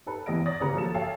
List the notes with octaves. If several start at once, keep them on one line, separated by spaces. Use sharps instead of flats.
D#4 A4 B4
E2 E3 D#5 A#6 D7
C#5 D5 D#6 A#6
G#1 C#3 B4 A#5 C#7
F3 F#3 A#3 A4 A6 E7
A4 C#5 E5 F5 G5 A5